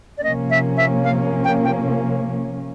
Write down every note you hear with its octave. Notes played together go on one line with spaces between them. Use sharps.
D5
C3 F3 A#3 C#4 D#5
E5
E5
F5
G5
G5